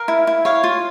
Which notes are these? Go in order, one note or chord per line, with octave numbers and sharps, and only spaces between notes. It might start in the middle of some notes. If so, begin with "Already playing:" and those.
Already playing: A#4 F5
E4
E4
C#5 F5
F4